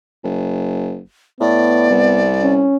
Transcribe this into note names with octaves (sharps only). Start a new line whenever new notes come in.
F#1
A2 B3 D5
C2
C#4